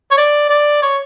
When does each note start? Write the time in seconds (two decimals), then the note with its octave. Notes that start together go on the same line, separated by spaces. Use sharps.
0.11 C#5
0.18 D5
0.49 D5
0.82 C#5